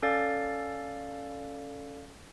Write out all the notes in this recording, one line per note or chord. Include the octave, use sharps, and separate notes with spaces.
C#4 A4 D5 F5 A6